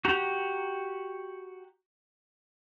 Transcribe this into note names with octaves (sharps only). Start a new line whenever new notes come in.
F#4 G4 A#5